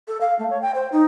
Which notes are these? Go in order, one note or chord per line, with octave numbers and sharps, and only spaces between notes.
A4
F5
A3
C#5
G5
C5
D#4